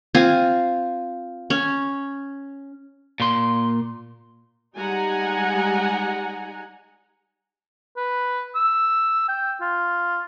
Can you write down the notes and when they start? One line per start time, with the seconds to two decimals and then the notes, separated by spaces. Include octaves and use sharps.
0.15 C4 F4 G#5
1.50 C#4
3.20 A#2 C6
4.76 G3 G#3 D#4 F#5 G#5 A#5
7.97 B4
8.55 E6
9.29 G5
9.61 F4